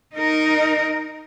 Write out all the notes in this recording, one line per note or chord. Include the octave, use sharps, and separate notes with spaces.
D#4 A#4